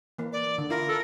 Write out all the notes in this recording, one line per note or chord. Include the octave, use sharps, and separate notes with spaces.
E3 A#3
D5
D3
E4 F4 A#4
A4